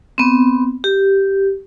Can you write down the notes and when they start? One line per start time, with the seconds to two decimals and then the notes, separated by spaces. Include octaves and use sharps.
0.18 B3 C4
0.84 G4